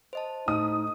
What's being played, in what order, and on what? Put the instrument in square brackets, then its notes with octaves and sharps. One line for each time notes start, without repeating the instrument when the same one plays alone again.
[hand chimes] C5 D#5 A5
[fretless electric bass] A2 [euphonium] D#4 [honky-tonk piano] D#6